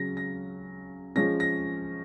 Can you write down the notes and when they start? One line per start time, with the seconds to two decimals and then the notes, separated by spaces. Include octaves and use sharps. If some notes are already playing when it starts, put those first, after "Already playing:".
Already playing: C#3 F#3 C#4 A#6
0.17 A#6
1.16 F3 G#3 C#4 A#6
1.40 A#6